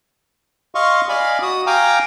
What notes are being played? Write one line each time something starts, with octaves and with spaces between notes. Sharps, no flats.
D#5 F5 C6 C#6
D5 D#5 F5 G#5 B5
F#4 D#6
F5 G5 G#5 A#5 D6